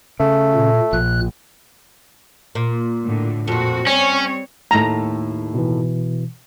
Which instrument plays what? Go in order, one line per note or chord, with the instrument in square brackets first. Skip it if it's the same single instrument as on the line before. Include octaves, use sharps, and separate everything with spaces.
[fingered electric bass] C#3 [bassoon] A3
[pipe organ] A#2
[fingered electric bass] A#1 [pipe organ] A#2 F#6
[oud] A#2
[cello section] A2 D3
[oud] F2 A#2 [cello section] F#4
[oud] G3 [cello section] C4 C#5 [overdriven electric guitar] C#4
[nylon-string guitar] D#2 A2 A3 [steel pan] A#5
[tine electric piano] B2 E3